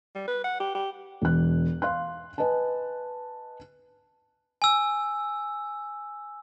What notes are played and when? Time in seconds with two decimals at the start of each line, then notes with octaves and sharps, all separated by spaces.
0.15 G3
0.28 B4
0.44 F#5
0.60 G4
0.75 G4
1.22 E1 F#6
1.82 F5 C6 F#6
2.38 B4 D#5 G#5 A5
4.62 G#5 E6